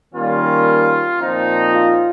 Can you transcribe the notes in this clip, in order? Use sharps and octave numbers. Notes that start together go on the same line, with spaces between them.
D#3 G3 A#3 C#4 F4
A#2 F3 C4 D#4
F4